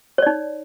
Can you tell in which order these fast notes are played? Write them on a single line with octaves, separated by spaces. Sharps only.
C#5 D5 D#4